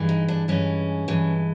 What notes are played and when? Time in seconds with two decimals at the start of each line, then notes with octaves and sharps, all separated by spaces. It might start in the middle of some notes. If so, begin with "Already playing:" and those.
Already playing: G2 E3 G#3
0.09 D#4
0.28 D4
0.48 G2 E3 G#3 C#4
1.08 G2 E3 G#3